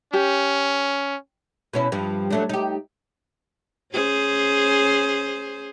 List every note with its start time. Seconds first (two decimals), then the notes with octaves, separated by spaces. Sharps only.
0.13 C#4 G4
1.73 B2 C#4 E4
1.92 G2 F3
2.31 F#3 A3 D4
2.49 D#4 G4
3.93 C#4 G#4 C5